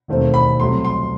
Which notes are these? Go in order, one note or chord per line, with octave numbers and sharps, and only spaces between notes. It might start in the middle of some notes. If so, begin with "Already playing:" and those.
E1 D#2 D#3 A3 C4
B5
C2 C3 F#3 A3 C6
C6